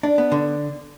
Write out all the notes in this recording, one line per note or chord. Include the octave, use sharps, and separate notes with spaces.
D4
B3
D3